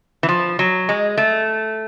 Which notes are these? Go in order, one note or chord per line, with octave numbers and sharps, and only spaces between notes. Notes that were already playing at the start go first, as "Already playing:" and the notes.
E3
F3
F#3
G#3
A3